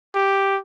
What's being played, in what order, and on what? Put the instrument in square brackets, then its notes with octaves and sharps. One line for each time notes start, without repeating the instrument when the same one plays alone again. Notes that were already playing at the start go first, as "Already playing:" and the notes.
[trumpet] G4